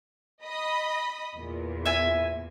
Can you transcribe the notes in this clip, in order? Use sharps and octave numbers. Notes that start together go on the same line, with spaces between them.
D#5 B5 D#6
E2 A#2
E5 G#5